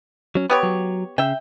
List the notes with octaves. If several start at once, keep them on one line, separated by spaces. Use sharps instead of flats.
F#3 C#4
B3 G4 B4 C#5
F#3
C#3 E5 G5